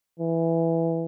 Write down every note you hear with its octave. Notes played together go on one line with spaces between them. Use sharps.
E3